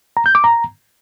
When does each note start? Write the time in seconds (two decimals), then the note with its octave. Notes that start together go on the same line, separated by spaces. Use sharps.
0.17 A#5
0.26 G6
0.35 D6
0.44 A#5